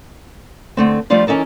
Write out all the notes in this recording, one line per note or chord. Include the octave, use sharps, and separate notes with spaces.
D3 A3 C4
F3 G3 A3 D4 F4 D5
E3 C#4 D#4 A4 A#4